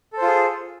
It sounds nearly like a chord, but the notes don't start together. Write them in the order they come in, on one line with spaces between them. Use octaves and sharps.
A4 C5 F4 G#4